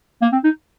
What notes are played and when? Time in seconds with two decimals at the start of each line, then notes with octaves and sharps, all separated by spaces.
0.22 A#3
0.32 C4
0.44 D#4